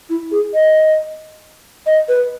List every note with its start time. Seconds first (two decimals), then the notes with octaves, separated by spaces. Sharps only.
0.10 E4
0.31 G#4
0.54 D#5
1.86 D#5
2.09 B4